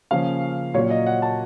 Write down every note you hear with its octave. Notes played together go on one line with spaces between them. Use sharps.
C#3 F3 A#3 C#4 F5
A#2 F#3 A#3 C#5
D#5
F#5
A5